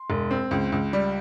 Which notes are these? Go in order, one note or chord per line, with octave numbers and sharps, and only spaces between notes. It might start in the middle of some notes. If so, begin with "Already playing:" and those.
Already playing: C6
E1
C4
C#2
C#2
G3